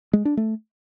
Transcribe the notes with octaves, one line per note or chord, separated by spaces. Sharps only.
G#3
D4
A3